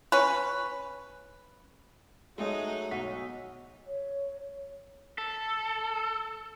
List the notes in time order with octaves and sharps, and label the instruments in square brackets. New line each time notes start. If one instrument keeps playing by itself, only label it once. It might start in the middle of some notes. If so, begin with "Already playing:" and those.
[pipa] C#4 B4
[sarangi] F#3 [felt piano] G#3 A3 G#4 [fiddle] D#4
[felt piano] B1 F#4 B6
[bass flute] C#5
[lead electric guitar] A4